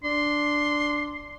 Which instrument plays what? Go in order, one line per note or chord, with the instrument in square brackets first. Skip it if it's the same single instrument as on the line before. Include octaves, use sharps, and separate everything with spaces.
[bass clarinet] D4 [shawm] C6